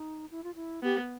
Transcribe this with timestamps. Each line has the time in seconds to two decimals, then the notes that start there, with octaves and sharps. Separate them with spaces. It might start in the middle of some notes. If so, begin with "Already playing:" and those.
Already playing: D#4
0.31 E4
0.44 F4
0.55 E4
0.83 B3 G4